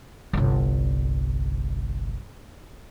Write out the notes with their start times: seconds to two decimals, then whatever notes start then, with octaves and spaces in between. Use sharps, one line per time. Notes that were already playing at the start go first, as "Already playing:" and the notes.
0.33 G1 C2